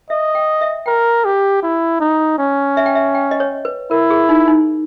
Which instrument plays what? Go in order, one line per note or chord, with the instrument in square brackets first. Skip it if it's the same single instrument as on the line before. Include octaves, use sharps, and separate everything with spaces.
[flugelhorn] D#5 [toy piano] E5
[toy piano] G5
E5
[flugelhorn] A#4 [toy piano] G5
[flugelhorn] G4
E4
D#4
C#4
[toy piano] E5
G5
E5
G5
D#5
C#5
B4
[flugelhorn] E4 [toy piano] A#4
[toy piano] G#4
D#4
D#4